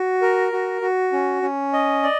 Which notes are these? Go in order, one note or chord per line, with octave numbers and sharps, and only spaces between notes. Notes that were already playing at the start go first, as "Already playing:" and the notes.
Already playing: F#4
A#4
F#4
F#4
C#4
C#4
D#5
D5